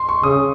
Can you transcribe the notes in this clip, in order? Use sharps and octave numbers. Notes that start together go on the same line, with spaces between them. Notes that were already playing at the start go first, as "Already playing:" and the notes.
Already playing: C6
C#6
C#3 D#6